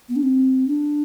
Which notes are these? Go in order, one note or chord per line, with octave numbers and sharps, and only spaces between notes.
B3
D4
C4
D4